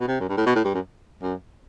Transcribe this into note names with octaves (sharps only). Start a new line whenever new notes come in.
B2
C3
F#2
G2
A2
B2
A2
G2
F#2
F#2